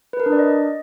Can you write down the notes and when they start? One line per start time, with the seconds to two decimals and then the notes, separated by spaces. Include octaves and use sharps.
0.13 B4
0.20 A#4
0.26 D4
0.32 D5
0.39 D#5